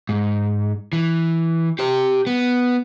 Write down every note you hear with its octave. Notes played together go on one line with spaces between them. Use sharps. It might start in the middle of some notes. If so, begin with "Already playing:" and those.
G#2
E3
G4 C5
B3